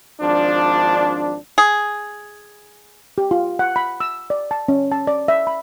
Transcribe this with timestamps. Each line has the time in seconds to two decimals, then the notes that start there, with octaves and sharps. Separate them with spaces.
0.21 G#1 F3 D4
1.58 G#4
3.18 G4
3.31 F4
3.59 F#5
3.76 B5
4.00 E6
4.30 D5
4.51 A5
4.68 C#4
4.92 A5
5.07 D5
5.28 E5
5.47 B5